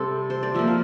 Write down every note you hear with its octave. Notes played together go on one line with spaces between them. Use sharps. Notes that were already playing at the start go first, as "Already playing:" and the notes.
Already playing: C3 G3 C4 A4 C5
C5
D5
F3 A#3 E5
F5